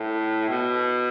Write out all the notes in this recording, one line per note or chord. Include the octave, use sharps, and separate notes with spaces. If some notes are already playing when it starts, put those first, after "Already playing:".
Already playing: A2
B2